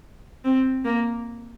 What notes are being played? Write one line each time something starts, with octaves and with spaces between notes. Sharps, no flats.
C4
A#3